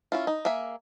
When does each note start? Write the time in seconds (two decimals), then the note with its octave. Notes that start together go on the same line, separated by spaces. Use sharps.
0.12 C#4 E4 F4
0.27 D#4
0.45 A#3 G#4 E5 G#5